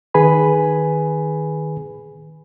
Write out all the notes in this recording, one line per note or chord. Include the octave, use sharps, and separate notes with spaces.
D#3 G#4 B4 G#5 B5